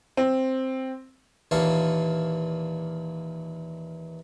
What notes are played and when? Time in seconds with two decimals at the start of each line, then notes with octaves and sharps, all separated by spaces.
0.17 C4
1.51 D#2 A#2 E3 F5 A5 C#6